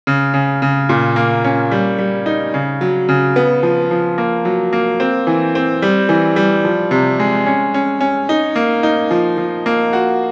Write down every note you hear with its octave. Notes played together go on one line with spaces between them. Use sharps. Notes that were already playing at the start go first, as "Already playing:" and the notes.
C#3
C#3
C#3
A#2
A#3
C#4
G3
G3
D#4
C#3
F#3
C#3
B3
F3
F3
A#3
F#3
A#3
C4
E3
C4
G3
E3
G3
F3
C3
G#3
C#4
C#4
C#4
D#4
A#3
D#4
F3
F3
A#3
F#4